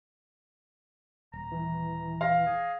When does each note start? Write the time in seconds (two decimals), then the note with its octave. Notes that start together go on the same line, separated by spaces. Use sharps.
1.33 D#1 A#5
1.52 E3
2.21 F5 A#6
2.46 G#4